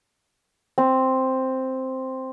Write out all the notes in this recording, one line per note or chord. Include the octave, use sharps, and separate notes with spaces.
C4